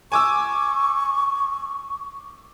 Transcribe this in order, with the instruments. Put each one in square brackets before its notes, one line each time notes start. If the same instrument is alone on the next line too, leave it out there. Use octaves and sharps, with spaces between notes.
[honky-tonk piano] G#5 D6 E6 [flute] C#6